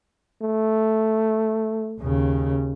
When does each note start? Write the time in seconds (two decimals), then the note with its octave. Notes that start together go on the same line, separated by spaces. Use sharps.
0.42 A3
2.01 D#2 C#3